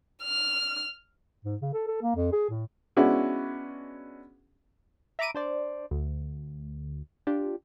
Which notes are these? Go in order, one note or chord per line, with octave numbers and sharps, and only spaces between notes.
F6
G#2
C#3
A4
A4
A#3
F2
G#4
A2
G#3 B3 C#4 D4 E4 F#4
E5 A#5 B5 D6 D7 D#7
D4 C5 D5
D2
D4 F4 G4